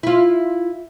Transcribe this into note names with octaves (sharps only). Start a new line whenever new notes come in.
E4 F4